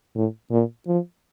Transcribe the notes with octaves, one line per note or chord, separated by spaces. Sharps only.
A2
A#2
F3